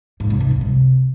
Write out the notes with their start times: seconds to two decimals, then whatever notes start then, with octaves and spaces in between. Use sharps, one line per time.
0.20 G#2
0.30 C#3
0.40 B2
0.51 G2
0.61 C3